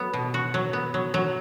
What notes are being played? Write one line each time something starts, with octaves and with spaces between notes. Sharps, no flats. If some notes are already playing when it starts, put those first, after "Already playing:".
Already playing: F#3 B3
B2
F#4
F#3
B3
F#3
F#3